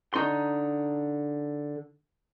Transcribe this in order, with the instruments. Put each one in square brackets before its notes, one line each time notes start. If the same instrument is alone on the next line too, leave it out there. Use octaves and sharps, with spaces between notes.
[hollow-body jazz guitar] D3 D#4 C6